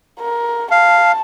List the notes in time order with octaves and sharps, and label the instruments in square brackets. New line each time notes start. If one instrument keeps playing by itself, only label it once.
[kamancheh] A#4
[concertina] F5 [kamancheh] A5